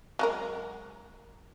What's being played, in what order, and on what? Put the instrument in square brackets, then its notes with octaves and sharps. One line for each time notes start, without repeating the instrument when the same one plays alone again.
[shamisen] F#3 G#3 A#4